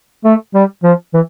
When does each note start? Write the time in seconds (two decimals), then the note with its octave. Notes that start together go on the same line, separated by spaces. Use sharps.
0.25 A3
0.54 G3
0.83 F3
1.14 E3